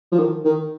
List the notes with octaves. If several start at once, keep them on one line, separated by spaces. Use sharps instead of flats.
F3
D#3
D#3